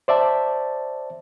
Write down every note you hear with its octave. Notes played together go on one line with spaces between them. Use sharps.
C5 D5 E5 A5